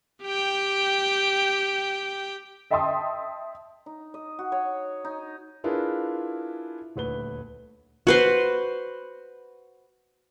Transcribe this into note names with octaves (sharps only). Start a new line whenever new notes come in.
G4 G5
D#5 E5 G5 A5 C6 D#6
D#4
D#5
F#4
C#5
D#4
D4 E4 F4 G#4 A#4 B4
D#1 D2 B4 G7
F#4 B4 C5